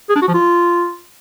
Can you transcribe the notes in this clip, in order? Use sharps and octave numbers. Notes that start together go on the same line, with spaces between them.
G#4
D4
F#4
F3
F4